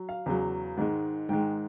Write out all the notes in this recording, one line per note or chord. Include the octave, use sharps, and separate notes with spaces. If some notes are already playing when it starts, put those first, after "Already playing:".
Already playing: F#3
F5
E2 C#3 F#3
G#2 D#3 G#3
G#2 D#3 G#3 G5